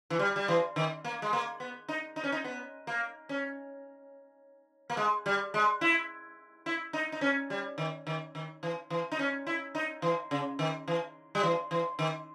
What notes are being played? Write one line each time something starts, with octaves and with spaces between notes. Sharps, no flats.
E3
G3
G3
E3
D#3
A#3
G#3
A#3
B3
D#4
D#4
C#4
D#4
B3
A#3
C#4
A#3
G#3
G3
G#3
E4
E4
D#4
D#4
C#4
G3
D#3
D#3
D#3
E3
E3
D#4
C#4
E4
D#4
E3
C#3
D#3
E3
G3
E3
E3
D#3